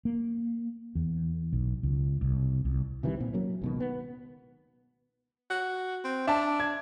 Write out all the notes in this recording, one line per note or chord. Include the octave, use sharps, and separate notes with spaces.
A#3
E2
B1
C#2
C2
C2
C3 D#3 E3 G3
A#2 C4
F#3 A#3 C#4
C#2 B2 D#3
B3
F#4
C4
D4 E5 A5
G#6